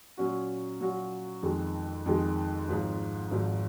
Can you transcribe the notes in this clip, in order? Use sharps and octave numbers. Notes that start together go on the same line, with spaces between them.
A#2 F#3 C#4 F#4
A#2 F#3 C#4 F#4
F2 D#3 G#3
F2 D#3 G#3
G#1 G#2 F3
G#1 G#2 F3